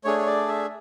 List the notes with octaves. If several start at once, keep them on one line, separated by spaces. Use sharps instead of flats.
A3 D4 G#4 C#5
C#5
D5
E5